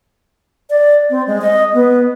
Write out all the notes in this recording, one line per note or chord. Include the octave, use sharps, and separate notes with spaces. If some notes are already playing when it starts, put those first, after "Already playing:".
D5
C4
G#3
D#5
B3